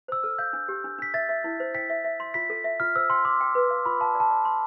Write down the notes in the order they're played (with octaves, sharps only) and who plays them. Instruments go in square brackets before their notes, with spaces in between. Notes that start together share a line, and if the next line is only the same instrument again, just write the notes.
[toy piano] C5 [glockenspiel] E6
[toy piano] A4 [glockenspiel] F6
[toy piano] F5 [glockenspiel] G6
[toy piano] D4
G4
D4
[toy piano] D4 [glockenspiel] B6
[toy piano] E5 [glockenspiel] A6
[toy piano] E5
E4
C5
[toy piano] G5 [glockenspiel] B6
[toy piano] E5
E5
C6
[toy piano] F4 [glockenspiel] B6
[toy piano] A4
E5
[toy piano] F4 [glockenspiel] F6
[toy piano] C5 [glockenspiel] E6
[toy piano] G5 [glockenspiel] C6
[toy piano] C6 [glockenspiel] D6
[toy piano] G5
B4
F5
[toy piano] F4 [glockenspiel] B5
[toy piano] F5 [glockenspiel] A5
[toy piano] D5
[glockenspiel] A5
[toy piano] D5
C6